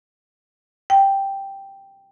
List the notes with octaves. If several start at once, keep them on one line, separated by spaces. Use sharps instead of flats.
G5